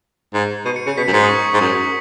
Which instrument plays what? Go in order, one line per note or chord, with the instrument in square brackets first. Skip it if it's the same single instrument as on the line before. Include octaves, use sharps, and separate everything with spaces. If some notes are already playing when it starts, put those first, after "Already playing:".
[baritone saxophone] G#2
[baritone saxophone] B2 [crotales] D#7
[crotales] C#7
[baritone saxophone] C#3 [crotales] C#7
[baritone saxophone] B2 [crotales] B6
[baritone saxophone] F#2
G#2
[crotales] D#6
C#6
[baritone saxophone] G#2
[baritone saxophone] F#2 [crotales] D#6